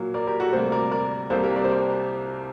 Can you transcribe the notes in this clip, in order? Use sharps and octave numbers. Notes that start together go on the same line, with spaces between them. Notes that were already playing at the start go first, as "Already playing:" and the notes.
Already playing: A#2 F#3 A#3
A#4 D5
G4 A#4
F#4 A4
D2 C3 G3 A#3 A4 C5
A#4 D5
A#4 D5
C2 C3 G3 A#3 A4 C5
G4 A#4
A#4 D5
C5
A#4 D5